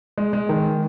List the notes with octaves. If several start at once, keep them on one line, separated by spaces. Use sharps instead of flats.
G#3
G#3
D#3